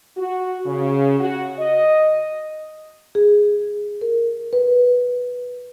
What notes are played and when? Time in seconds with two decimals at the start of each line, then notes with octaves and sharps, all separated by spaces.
0.17 F#4
0.66 C#3
1.20 F#4
1.59 D#5
3.15 G#4
4.01 A#4
4.53 B4